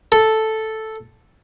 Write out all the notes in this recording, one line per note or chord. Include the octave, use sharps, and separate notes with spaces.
A4